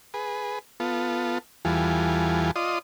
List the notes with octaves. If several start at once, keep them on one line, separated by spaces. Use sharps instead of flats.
G#4 B4
B3 F4 A4
E2 E3 G3 F4 A4 G#5
F4 D5 D#5 C6 D#6